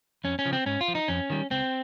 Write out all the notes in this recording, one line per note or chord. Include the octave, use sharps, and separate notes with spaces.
F2 C#4
C#4
C#3 F3
C4
G#2 C#4
F4
F3
D#4
F2 C#4
D#3 G3
C#2 C4